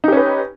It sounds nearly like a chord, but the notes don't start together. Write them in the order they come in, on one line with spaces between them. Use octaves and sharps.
D#4 G4 C#4 B4